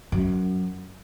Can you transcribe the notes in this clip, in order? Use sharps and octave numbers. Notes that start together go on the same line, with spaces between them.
F#2